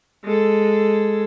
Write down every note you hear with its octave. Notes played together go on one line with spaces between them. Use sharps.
G#3 A4